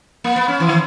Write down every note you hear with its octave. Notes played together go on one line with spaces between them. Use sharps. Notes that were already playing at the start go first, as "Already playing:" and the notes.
A#3
B3
C#4
E3
D#3